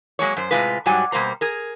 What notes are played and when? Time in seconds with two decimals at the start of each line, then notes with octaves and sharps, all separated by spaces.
0.19 F#3 G#3 A#3 C#5
0.37 F#2 C5
0.51 A2 C3 G#3 F4 B4
0.86 G#2 F#3 G3 F#4 G#5
1.12 B2 G3 A#3 C5 A#5
1.41 G#4 A#4